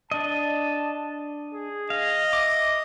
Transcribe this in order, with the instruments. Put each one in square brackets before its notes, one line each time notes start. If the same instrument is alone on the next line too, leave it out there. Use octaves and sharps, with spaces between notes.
[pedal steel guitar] D4 D#5 [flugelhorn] A5
[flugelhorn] G#4
[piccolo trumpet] D#5 [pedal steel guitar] F5
[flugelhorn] E5 [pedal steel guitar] D6